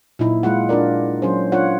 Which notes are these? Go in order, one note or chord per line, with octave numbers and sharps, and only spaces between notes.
A#2 F#3 D#4 E4
G#3 F4 F#5
D4 F4 A#4 D5
F#3 C#4 G#4 C5
D4 F4 C#5 F#5